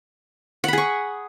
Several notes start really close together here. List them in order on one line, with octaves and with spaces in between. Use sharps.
F#5 B5 G#4 C#6